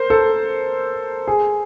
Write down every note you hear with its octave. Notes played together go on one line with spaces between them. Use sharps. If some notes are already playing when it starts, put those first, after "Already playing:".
Already playing: A#4 C5
A4
G#4